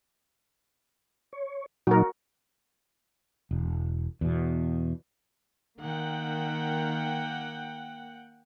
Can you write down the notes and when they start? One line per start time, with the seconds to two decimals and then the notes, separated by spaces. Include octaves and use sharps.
1.33 C#5
1.87 A#2 F#3 D#4 F#4 A#4
3.51 E1
4.21 E2 B2
5.80 D#3 A#3 F#5 G5